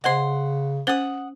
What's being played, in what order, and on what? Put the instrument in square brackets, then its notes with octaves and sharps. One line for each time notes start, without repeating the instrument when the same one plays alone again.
[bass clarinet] C#3 [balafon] C5 D#5 [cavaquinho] F#5 C6
[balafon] C#4 C5 [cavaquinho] F#5 D#6